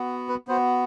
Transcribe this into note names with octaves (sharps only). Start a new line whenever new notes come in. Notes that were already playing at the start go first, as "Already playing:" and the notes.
Already playing: B3 F#4
B4
B3 F#4 C5